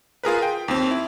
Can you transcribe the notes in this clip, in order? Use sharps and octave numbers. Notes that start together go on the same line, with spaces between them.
F4 G#4 A#4 B4
G5
D#2 C4
E4